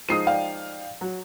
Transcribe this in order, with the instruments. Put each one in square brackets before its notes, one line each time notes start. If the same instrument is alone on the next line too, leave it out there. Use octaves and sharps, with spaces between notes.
[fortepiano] F3 G#3 D#4 [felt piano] D#6 C7 D#7
[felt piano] D5 F5 G5
[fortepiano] F#3